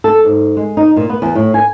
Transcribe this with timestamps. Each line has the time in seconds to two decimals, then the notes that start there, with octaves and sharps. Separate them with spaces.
0.04 A4
0.25 G#2
0.57 G#3
0.77 D#4
0.96 A#2
1.10 B3
1.22 E2
1.35 A2
1.54 G#5